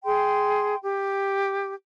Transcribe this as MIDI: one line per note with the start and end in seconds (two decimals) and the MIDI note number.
0.04 0.76 68
0.04 0.76 79
0.04 0.76 84
0.81 1.74 67